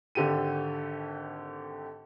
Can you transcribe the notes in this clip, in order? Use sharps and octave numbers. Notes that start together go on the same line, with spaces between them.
G#1 D3 G4 A4 D#7